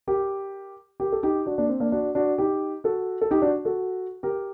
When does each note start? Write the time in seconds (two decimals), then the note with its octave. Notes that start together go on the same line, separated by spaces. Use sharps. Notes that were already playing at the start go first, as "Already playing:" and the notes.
0.07 G4 A#4
1.00 G4 A#4
1.12 A4
1.23 D#4 G4
1.46 D4 F#4
1.58 A#3 D4
1.69 C4
1.80 A#3 D4
1.92 D4 F#4
2.15 D4 F#4
2.38 D#4 G4
2.84 F#4 A4
3.22 A4
3.31 D#4 G4
3.42 D4 F#4
3.65 F#4 A4
4.23 G4 A#4